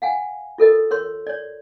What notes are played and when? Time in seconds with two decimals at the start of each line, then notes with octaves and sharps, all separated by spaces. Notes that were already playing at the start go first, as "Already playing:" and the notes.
0.02 F5 F#5 G#5
0.58 F4 A4 A#4 D#5
0.91 A#4 C#5 C6
1.27 C#5 D5